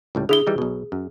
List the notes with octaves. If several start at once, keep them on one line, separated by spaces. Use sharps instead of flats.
C#2 A2 G3
D3 E4 G#4 G7
E3 G3 D#4
B1 B2
F#2